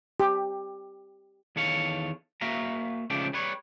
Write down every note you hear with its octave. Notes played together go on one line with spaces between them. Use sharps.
G4
E2 D#3 A4 C#5 F5
A#3 F#4 E5 F5 A#5
C#2 C#3 F3 A3 D4 G4
G3 B4 C#5